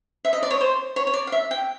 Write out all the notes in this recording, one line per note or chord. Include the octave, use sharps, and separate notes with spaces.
E5
D#5
D5
C#5
C5
C#5
C#5
D5
F5
E5
G5